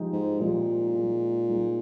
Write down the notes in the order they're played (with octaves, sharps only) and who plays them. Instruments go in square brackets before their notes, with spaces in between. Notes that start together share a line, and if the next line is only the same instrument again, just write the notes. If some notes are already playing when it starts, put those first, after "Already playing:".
Already playing: [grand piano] F3 G#3 D#4 G4
[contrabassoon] G#2
[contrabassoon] A#2 [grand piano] F3 G#3 D#4 G4
[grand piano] G#3 D#4 G#4
G#3 D#4 G#4